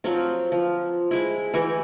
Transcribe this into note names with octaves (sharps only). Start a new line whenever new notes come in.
F3 F#3 C4
F3
G#3 E4
E3 F#4 G4 G#5